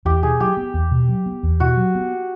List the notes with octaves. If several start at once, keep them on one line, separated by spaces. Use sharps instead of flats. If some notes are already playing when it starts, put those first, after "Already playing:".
E2 G4
B2 G#4
F#3 G4
B3
E2
B2
F#3
B3
E2
B2 F#4
F#3
B3